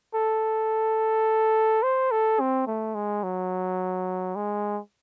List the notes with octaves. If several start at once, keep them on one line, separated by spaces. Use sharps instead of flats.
A4
C5
A4
C4
A3
G#3
F#3
G#3